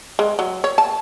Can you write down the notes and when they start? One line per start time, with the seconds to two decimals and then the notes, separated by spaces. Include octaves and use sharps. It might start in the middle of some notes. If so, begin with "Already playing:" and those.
0.19 G#3
0.39 F#3
0.64 C#5
0.78 A5